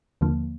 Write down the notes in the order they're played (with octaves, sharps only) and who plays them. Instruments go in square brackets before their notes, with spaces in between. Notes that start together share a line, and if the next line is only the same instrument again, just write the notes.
[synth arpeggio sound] D#2 D3 F3 A#3